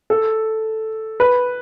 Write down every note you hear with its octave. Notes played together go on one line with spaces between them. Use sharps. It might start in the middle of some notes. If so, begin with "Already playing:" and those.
A4
B4